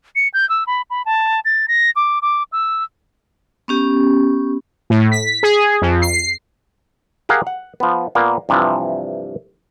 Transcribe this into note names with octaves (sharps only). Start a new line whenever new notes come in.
C#7
G6
E6
B5
B5
A5
A6
A#6
D6
D6
E6
B3 C#4 G4
A2
B6
G#4
F2
C7
G4 G#4 A#4 F5 F#5
F#5
F3 B3
A#2 A#3 B3
G2 C3 E3 F3